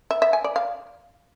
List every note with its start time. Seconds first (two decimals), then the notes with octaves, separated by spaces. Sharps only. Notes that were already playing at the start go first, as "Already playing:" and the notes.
0.11 E5
0.22 E5
0.33 G#5
0.44 D5
0.56 F5